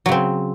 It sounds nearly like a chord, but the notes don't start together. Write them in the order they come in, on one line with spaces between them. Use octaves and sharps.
F#3 C#3 C4